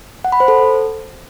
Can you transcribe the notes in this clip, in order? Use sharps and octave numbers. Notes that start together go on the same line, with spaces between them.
F#5
B5
C5
A4